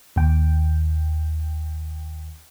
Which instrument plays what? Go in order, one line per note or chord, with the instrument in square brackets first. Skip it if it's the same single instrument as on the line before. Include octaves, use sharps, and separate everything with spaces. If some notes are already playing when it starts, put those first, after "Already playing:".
[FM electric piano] D#2 G5